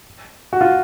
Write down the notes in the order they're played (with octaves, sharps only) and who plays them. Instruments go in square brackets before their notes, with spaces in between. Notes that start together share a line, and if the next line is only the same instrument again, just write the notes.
[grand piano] F#4
F4